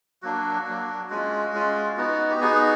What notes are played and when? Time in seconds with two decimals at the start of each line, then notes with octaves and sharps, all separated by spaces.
0.22 F#3 A#3 D4 F#4
0.67 F#3 A#3 D4
1.10 G#3 C#4 F4 F#4
1.53 G#3 C#4 F4
1.97 B3 D#4 F#4
2.30 G4
2.40 B3 D#4 F#4 G#4